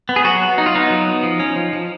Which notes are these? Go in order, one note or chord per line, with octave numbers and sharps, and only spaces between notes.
B3
G#4
F#3 F#4
B3
F#3 D#4
F4
B3 D#4
F#3
B3
F3
C#4
F3
F3